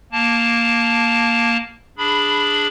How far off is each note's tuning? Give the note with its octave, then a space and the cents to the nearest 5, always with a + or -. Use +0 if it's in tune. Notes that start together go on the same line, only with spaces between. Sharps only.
A#3 +0 A5 +0
D4 +0 G#4 +0 B5 +0